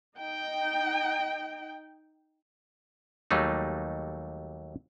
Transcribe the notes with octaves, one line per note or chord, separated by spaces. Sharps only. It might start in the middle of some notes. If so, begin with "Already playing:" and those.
D#4 G5
D#2 F#3 G3 A3 D#4